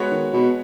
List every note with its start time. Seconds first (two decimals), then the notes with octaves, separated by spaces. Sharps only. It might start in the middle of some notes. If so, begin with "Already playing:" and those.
Already playing: G#3 B3 F#4 C#5
0.11 D#3
0.33 B2